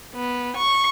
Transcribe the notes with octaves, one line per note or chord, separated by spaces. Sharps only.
B3
C#6